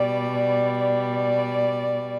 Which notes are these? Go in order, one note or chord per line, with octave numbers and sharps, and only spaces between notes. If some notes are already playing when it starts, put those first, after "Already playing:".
Already playing: B2 G3 D5
D5